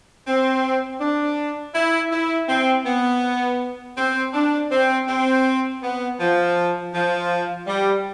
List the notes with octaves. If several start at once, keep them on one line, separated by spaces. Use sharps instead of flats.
C4
D4
E4
E4
C4
B3
C4
D4
C4
C4
B3
F3
F3
G3